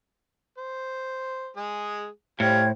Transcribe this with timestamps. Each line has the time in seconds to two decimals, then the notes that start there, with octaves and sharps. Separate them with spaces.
0.58 C5
1.57 G#3 G#4
2.40 A2 G3 C5 F5 G5 G#6